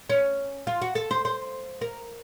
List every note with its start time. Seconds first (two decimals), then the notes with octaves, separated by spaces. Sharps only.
0.10 C#4
0.67 F4
0.82 F#4
0.95 A4
1.11 C5
1.25 C5
1.81 A#4